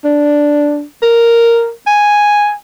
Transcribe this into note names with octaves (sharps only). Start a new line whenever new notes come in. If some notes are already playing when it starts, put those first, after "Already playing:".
D4
A#4
G#5